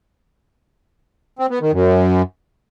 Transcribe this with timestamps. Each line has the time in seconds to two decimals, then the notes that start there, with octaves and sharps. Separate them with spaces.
1.39 C4
1.50 B3
1.61 D#3
1.72 F#2